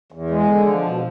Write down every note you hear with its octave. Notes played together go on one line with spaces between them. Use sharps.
E2
G#3
D3
F3
B2